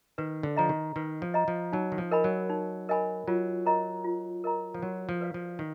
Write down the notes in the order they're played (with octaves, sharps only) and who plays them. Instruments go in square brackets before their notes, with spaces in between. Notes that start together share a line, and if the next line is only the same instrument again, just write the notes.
[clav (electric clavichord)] D#3 [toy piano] B4
[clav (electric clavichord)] D3
[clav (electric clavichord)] F3 [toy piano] D#5 A#5
[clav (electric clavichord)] D#3
[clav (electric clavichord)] D#3 [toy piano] B4
[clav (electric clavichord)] F3
[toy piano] D#5 A#5
[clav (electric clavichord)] F3
[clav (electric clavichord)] F#3 [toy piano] D#4
[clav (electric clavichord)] D#3
F3
[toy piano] A#4 D#5 G#5 B5
[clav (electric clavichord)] F#3
[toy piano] D#4
A#4 D#5 G#5 B5
[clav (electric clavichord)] F#3 [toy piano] F4
[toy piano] A#4 D#5 A#5
F4
A#4 D#5 A#5
[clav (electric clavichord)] F3
[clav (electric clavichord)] F#3 [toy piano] F#4
[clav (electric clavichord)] F3
[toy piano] B4 D5 F5
[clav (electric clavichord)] F3
D#3